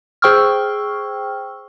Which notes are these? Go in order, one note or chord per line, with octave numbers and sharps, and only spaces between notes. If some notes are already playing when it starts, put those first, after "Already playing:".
G#4 C5 G5 C#6 E6 F6